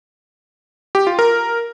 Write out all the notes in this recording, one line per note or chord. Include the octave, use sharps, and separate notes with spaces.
G4
F4
A#4